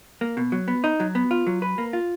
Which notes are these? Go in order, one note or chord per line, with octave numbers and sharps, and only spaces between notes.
A#3
B2
F#3
B3
D#4
F#3
B3
F4
F#3
B4
A#3
F4